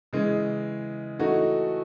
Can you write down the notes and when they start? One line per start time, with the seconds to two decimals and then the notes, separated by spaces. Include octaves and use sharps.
0.13 C#3 E3 G#3
1.19 E3 A3 D#4 F#4